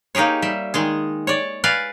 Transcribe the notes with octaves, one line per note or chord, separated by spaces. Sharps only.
A#3 D#4 G4 G#4 C#5
G3 E5
D#3 G#3 G#4
C#5 D5
B4 D5 F5 G#5